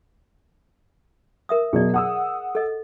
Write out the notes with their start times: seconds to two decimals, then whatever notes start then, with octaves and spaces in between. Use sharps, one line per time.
1.49 A#4 E5 D#6
1.73 B2 F#3 G#4 D5
1.94 F#5 D#6 E6
2.55 A4 D#5